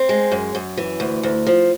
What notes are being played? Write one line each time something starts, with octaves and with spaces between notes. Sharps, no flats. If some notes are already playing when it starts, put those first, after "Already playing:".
Already playing: C4
G#3
F#2
F#2
E3
D2
D2
F3